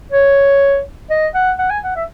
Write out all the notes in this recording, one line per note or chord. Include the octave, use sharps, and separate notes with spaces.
C#5
D#5
F#5
F#5
G#5
F#5
E5